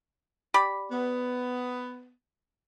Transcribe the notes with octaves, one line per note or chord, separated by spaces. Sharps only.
G4 D5 B5
B3